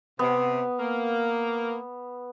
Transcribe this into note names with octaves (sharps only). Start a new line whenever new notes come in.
C3 B3
A#3